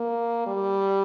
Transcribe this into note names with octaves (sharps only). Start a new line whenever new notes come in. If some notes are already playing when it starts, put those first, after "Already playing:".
Already playing: A#3
G3